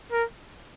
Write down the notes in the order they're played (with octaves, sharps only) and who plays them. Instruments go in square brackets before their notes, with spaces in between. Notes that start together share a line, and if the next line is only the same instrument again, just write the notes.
[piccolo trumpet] A#4